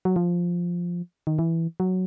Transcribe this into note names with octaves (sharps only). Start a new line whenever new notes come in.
F#3
F3
D#3
E3
F#3